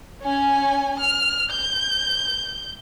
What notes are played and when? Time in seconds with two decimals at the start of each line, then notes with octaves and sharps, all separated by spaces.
0.23 C#4 G#5
1.00 F6
1.51 G6